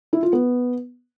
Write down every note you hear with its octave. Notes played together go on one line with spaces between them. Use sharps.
E4
F4
B3